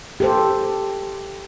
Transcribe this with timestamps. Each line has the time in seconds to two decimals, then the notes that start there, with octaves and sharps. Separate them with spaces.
0.20 G4 A4 C5